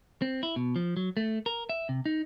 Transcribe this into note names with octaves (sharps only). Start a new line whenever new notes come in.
C4
E4
B2
F3
F#3
A3
A#4
E5
C3
D#4